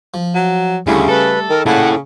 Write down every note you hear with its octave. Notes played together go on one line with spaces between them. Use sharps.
F3
F#3
D2 C#3 G3 A3 E4
A4 B4
D#3 A#4
A#2 C#3 E4 A4 F#5 G#5